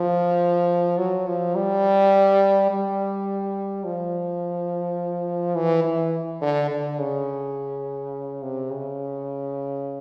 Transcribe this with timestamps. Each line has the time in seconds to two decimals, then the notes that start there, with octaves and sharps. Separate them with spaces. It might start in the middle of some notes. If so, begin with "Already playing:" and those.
Already playing: F3
0.98 F#3
1.27 F3
1.55 G3
2.71 G3
3.85 F3
5.56 E3
5.85 E3
6.42 D3
6.70 D3
6.99 C#3
8.42 C3
8.71 C#3